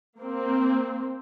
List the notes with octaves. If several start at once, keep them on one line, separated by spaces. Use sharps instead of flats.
A#3 C4